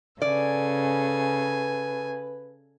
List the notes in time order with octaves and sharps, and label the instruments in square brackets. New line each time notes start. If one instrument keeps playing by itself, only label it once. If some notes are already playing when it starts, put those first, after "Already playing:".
[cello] C#3 [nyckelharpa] A4 G#5 [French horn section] B4 [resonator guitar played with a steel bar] D5